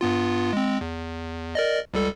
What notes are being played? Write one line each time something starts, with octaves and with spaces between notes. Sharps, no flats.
G2 B3 F4
G#3 C4
E2
A#4 D5 D#5
C#2 G3 A4